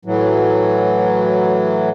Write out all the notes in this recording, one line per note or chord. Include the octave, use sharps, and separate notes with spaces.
A2 E3 F#3